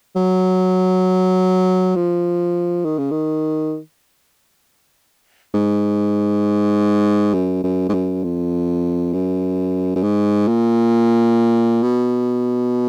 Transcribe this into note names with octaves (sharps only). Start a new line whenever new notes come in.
F#3
F3
D#3
C#3
D#3
G#2
F#2
F#2
G#2
F#2
F2
F#2
F#2
G#2
A#2
B2